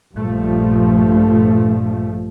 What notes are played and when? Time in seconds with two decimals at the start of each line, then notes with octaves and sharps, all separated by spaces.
0.14 A#1 G2 F3 A3